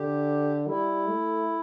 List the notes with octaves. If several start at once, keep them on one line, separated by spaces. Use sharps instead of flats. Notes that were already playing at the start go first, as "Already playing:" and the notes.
Already playing: D3 G4
G3 E4
A3